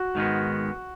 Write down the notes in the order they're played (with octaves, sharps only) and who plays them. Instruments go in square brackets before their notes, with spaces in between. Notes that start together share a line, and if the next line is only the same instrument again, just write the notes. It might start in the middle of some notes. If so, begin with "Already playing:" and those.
Already playing: [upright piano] F#4
[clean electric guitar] G#2 D#3 G#3 B3